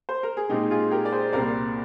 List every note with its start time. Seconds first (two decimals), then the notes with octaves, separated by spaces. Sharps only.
0.09 C5
0.23 A#4
0.37 G#4
0.50 A#2 G#3 C4 D#4 G4
0.71 F4 G#4
0.91 G4 A#4
1.05 D5
1.12 G#4 C5
1.33 C2 A#2 G3 C4 A#4 D5